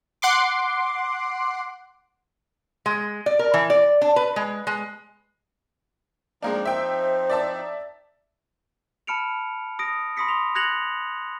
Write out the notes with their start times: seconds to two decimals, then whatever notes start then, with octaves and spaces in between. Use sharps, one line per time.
0.22 F#5 C6 D6
2.86 G#3
3.26 D5
3.39 A#4
3.54 E3
3.70 D5
4.02 D4
4.16 B4
4.36 G#3
4.67 G#3
6.43 F3 G#3 A#3 C4 D4 D#4
6.65 C5 E5 G5
7.30 D5 E5 A5
9.07 A5 B5 F6 C#7 D7 F7
9.79 D#6 A#6 D7
10.17 B5 C6 D#6 A#6 B6 C#7
10.29 C6 F7
10.55 F#6 G#6 A#6 C#7 F7 F#7